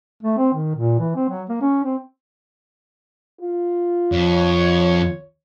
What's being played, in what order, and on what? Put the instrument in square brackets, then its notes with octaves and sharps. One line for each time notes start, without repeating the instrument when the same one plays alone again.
[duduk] A3
C4
D#3
A#2
E3
C4
F#3
A#3
C#4
C4
[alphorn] F4
[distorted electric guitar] F2 [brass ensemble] C#5